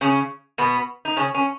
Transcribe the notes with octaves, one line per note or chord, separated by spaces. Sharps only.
C#3 C#4
B2 B3
D#4
C#3 C#4
C#4